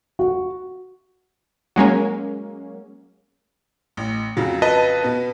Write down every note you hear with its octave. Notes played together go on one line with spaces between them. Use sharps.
F#4
F#3 G#3 A#3 C#4
A1
F2 C#3 F#3
B4 D#5 A5
B2 B3